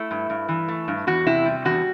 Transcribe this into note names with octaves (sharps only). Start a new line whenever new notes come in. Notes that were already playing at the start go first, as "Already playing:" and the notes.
Already playing: A3 E4
G2
G2
E3
A3
G2
E2 F#4
C3 E4
G3
E2 F#4